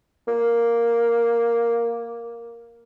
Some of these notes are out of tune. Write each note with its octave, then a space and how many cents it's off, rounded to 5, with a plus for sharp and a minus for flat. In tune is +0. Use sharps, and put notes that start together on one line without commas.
A#3 +0